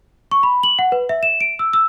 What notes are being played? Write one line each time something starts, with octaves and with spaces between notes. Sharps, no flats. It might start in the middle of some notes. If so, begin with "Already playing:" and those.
C#6
B5
F#7
F#5
B4
E5
E7
D7
E6
E6